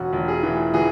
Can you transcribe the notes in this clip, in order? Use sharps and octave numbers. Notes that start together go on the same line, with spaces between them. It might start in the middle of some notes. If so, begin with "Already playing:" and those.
Already playing: E1 F#4
E1
G#4
E3
E3 G#4